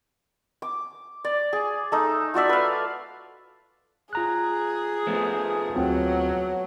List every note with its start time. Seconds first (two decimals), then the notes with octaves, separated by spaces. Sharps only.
0.62 D6
1.25 D5
1.53 G#4
1.92 A3 D#4
2.34 F4 F#4 D5 E5
2.49 B4 F5
4.13 F4 G#4 A#5 F#6
5.07 F3 A3 B3
5.76 D2 F#3 C4 F4